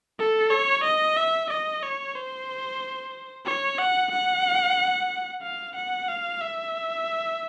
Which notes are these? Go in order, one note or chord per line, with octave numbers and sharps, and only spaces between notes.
A4
C#5
D#5
E5
D#5
C#5
C5
C#5
F#5
F#5
F5
F#5
F5
E5